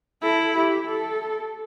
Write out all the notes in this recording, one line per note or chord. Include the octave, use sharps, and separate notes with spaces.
E4 A4
G4
A4